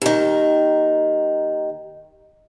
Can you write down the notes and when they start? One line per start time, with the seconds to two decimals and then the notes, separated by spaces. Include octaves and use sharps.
0.02 D#2 D#3